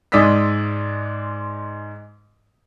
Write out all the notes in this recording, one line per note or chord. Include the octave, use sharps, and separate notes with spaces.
G#2 G#3 D5 D#6 E6 B6